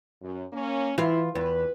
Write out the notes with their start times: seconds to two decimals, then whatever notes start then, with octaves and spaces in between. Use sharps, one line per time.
0.21 F#2
0.53 A#3 C#4
0.98 E3 E4 F4 F5
1.35 E2 B4